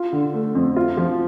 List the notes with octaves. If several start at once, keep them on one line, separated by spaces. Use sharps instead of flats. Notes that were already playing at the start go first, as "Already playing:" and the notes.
Already playing: F4
D3
A3
F2
F4
F3